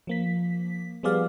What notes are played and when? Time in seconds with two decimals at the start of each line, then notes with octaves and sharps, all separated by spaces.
0.07 F3 A#3 B6
1.03 F3 G3 B3 G#4 D5 F5